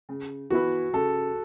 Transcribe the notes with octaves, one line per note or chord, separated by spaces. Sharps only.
C#3
E3 B3 E4 F#4 B4
C#3 A4